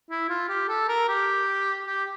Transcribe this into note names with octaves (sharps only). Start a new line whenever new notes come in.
E4
F4
G4
A4
A#4
G4
G4